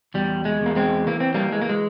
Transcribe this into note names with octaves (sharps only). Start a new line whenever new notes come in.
E2 G3
G#3
E2 A#3
G#3 C4
E3 A#3
C4
G3 A#3
E3 G#3
A#3
G#3